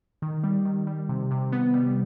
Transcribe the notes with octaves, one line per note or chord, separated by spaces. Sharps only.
D#3
G3
D#3
G3
C3
C3
B3
G3